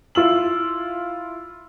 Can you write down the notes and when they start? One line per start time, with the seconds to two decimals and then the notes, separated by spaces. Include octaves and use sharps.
0.15 E4 F4 E6 F#7